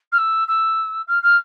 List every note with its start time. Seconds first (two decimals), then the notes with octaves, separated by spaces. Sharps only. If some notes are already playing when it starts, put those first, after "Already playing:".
0.12 F6
0.18 E6
0.48 E6
1.07 F6
1.23 F6